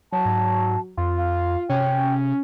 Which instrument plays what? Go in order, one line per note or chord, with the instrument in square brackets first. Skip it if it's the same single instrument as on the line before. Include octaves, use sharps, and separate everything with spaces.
[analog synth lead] F#3 [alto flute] A5
[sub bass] G#2
[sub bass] F2 [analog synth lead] F4
[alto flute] F5
[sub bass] C3 [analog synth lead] C#4 [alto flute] G5